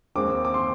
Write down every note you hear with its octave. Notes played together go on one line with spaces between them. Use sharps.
D#2 D#3 G#3 C4 D6
D6
C6